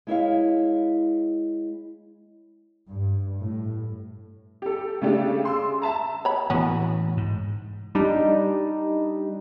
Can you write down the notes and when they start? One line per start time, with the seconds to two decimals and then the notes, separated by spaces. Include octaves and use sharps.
0.07 G#3 E4 C#5 F5
2.88 G2
3.42 A2
4.62 G4 A4
5.02 C#3 A3 D4 G4
5.43 G#4 C6 E6
5.82 E5 A5 A#5
6.25 C#5 B5
6.50 A2 E3 B3 C#4 F#4
7.17 G#2
7.95 G3 D4 D#4